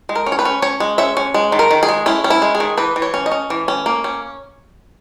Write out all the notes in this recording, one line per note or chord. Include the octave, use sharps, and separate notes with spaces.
G#3
A#4
C#4
C#5
B4
C#4
C#4 C#5
G#3
C#4 E5
C#4
G#3
D#3
A#4
D#3
G#4
G#3
C#4 E4
C#4
E4
G#3
G#4
D#3
E3 B4
E3
C#5
C#4
D#5
C#4
E3
C#4
A#3
C#4